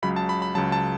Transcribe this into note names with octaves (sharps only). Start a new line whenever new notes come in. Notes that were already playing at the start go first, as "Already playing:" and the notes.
C#2 C#3 F#3 B5
A5
B5
B5
C#2 C#3 F#3 A5
A5